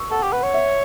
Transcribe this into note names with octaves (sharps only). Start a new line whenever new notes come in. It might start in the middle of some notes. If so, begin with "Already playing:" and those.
Already playing: C#6 E6
A4 F#5
G4
B4 F#5
C#5
E5